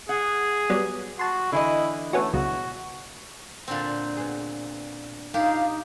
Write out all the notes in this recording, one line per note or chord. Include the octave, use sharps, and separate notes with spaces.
G#4 F#5
F#3 G3 B3
F#4 A5 C6
D3 E3 E4 D#5
A3 B3 C#4 F#4
C#2 B2 F#3 F#4
A#2 D3 C4
B3 G#4
D4 D#4 F4 G4 A#4 F5